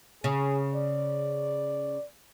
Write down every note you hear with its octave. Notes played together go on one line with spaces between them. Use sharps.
C#3 G#4
D5